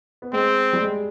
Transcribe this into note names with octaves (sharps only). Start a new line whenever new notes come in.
B3
G#3 C4
G3
G#3